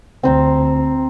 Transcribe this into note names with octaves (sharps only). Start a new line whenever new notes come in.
D2 C4 C5 A#5